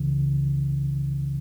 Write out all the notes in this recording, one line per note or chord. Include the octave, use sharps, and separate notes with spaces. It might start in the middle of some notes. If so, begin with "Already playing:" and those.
Already playing: C#2 C#3 E3